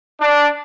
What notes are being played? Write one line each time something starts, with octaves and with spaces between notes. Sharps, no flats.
D4